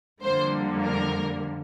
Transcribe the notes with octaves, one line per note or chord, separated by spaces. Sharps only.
F2 D3 G3 A#3 C5
A#4